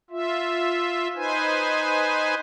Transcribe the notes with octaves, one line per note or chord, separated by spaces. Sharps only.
F4 E5
D#4 B4 C5 G#5